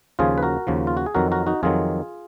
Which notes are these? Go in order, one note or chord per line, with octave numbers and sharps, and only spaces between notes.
D#2 C#3 F3 F4 G#4
B4
F#4 A#4
D#2 C#3 F3
F4
F#4
G#4
F2 D#3 F#3 F#4 A#4
F#4 A#4
D#4 F#4
F2 D#3 F#3 F4 G#4